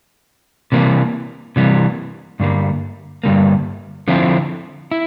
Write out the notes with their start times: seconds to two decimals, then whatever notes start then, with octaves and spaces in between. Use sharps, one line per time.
0.72 C3 E3 G3 A#3
1.56 C3 E3 G3 A#3
2.40 G2 D3 G3 A#3
3.24 G2 D3 G3 A#3
4.08 D3 F3 C4 E4
4.91 E4